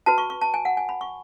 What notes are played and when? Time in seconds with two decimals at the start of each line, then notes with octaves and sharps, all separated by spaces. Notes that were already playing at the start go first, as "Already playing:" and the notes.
0.06 F#4 B4 A5
0.18 C#6
0.30 C#6
0.41 A5
0.54 G#5
0.65 F#5
0.77 G#5
0.89 B5
1.01 C#6